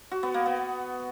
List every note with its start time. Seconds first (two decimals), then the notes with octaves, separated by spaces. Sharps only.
0.11 F#4
0.23 B3
0.34 A#3
0.46 B3